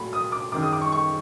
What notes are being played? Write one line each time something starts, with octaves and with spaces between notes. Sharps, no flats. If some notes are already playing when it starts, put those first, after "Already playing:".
Already playing: A#2 F#3 A3 B5
D#6
D6
F#2 D#3 G#3 D6
D#6
D6
C#6
C#6